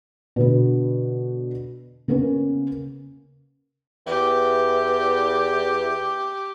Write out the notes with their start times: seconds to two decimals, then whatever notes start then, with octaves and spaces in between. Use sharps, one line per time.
0.36 B2 D3 B4
2.08 C#3 A#3 B3 C#4
4.07 E2 E3 G4